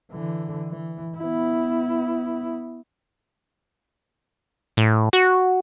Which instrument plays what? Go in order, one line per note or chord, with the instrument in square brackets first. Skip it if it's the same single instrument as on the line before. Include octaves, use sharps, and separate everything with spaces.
[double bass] D3 E3
E3
B3 E4
[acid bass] A2
F#4